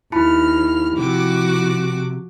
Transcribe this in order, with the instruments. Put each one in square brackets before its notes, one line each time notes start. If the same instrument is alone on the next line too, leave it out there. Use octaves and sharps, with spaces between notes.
[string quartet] D#2 F6 [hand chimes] E4 A5 B5
[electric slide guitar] C3 [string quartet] F3 F#4 D6